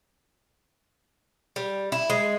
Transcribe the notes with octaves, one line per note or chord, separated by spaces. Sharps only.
G3
E4
G#3